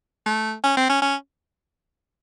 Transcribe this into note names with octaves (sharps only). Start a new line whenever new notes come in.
A3
C#4
C4
C#4
C#4